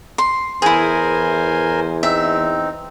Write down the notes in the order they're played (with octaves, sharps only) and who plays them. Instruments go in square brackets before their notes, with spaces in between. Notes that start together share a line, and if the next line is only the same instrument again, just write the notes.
[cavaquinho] C6
[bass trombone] E2 [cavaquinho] E4 G#4 [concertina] A#4 C5 G#5
[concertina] C4 D#4 [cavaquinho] E5